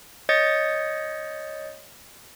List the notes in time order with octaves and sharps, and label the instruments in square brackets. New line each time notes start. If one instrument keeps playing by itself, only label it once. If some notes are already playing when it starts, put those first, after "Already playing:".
[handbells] C#5 D#5 D#6 G6 A6 C#7